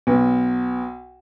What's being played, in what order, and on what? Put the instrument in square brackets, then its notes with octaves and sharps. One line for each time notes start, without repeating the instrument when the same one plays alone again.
[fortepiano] B1